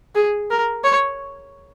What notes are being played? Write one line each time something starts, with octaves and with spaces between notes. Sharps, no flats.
G#4
A#4
C#5